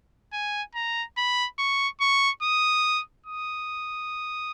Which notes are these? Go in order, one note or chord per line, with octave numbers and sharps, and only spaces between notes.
G#5
A#5
B5
C#6
C#6
D#6
D#6